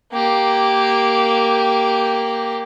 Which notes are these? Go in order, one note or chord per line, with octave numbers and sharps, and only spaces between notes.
A#3 G4